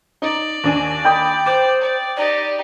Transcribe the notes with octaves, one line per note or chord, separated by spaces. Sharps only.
D#4 D5
D#2 D4 G#5
G5 B5 D#6
C5 D6
D5
D#4 G4 D5